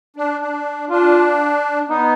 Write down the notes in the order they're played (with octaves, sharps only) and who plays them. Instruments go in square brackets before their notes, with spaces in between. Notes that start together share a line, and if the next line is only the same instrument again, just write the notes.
[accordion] D4
D4
[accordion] D4 [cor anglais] F4
[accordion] B3 [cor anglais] D#4